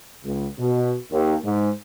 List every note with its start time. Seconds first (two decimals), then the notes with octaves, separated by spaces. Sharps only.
0.25 C#2
0.59 B2
1.11 D#2
1.43 G#2